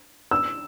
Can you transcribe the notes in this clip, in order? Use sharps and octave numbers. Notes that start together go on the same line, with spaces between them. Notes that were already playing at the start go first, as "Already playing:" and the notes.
E6